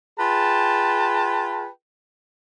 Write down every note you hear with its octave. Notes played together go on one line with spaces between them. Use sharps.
F4 G#4 B4 G5 A5